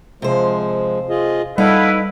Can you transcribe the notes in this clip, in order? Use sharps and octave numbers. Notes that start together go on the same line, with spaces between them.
C3 F3 G#3 C5
F4 G#4 D#5
G3 D#4 E4 A4 B4 F5 F#5